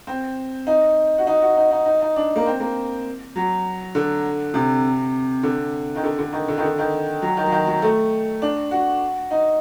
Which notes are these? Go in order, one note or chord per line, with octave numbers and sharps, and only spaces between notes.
C4
D#4
F#4
D#4
F#4
D#4
D#4
D#4
D#4
D4
A#3
C4
A#3
F#3
D3
C3
D3
D#3
D3
D3
D#3
D3
D#3
D3
D#3
F#3
D#3
F#3
D#3
F#3
A3
D4
F#4
D#4